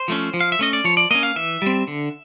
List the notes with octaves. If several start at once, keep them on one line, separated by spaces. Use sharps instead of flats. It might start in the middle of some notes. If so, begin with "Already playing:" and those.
Already playing: C5
F3 A3 C#4
F3
F5
E5
A3 C#4 D#5
D5
F3 C#5
D5
A#3 C#4 D#5
F5
E3 E5
G3 C4
D3